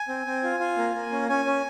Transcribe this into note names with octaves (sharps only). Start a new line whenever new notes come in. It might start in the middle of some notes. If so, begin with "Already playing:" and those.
Already playing: G#5
C4
C4
F4
F4
A#3
A#3
C#4
C#4 G#5
C#4